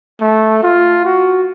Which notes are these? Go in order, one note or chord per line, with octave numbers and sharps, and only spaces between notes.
A3
F4
F#4